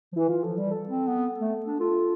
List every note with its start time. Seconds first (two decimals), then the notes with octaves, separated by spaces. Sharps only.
0.13 F3
0.16 E3 E4
0.29 E3 F4
0.43 F3 A4
0.57 G3
0.71 A4
0.89 C4
1.07 B3
1.39 A3
1.66 D4
1.79 F4 A4